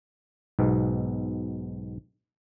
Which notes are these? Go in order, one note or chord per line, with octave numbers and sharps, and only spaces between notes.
B1 G#2 B2